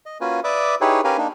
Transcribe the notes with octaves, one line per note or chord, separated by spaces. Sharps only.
D#5
A#3 C#4 F4 F#4 B4 G#5
B4 D5 E5 D6 D#6
D#4 E4 G4 G#4 B4 C#5
C#4 G4 A#4 B4 F5 G#5
A#3 D4 D#4